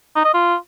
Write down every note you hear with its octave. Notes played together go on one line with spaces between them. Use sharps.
D#4
D#5
F4